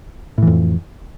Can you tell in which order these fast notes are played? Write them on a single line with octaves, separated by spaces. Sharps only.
A2 E3 F2